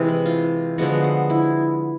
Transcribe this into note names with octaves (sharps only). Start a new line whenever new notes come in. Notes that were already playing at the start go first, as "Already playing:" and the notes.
Already playing: C3 E3 G#3
E4
F4
D3 F3 G#3 B3 F#4
F#4
E4